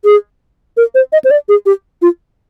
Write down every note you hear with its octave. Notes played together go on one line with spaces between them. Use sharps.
G#4
A#4
C5
D#5
C5
D5
G#4
G4
F4